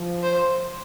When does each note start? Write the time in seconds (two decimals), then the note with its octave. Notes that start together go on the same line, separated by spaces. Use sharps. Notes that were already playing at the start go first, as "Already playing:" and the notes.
Already playing: F3
0.23 C5